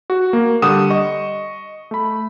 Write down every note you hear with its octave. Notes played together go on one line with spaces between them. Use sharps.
F#4
A#3
D3 G3 F#5 C#6 D#6 E7
D#5 C#6
A3 B5